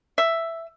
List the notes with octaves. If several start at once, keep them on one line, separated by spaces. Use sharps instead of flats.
E5